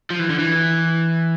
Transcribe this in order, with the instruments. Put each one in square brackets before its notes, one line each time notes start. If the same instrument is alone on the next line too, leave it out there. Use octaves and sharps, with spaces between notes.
[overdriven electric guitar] F3
E3
D3
E3